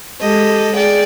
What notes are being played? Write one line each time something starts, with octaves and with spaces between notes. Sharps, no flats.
G#3 G4 A4 D#5
G#4 D5 G5